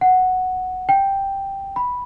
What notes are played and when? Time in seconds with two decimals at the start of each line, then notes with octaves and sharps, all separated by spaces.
0.01 F#5
0.89 G5
1.76 B5